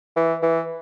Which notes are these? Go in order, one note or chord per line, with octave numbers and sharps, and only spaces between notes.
E3
E3